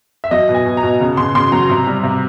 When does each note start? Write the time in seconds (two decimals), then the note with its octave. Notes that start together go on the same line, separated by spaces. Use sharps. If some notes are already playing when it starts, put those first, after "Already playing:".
0.24 E5
0.31 F#3 D#5
0.49 B2
0.54 G#5
0.65 B2
0.77 A#5
0.83 B2
1.00 C#3
1.17 C#3 C6
1.35 C#3 C6
1.52 F#3 A#5
1.70 C3
1.87 G3
2.04 C3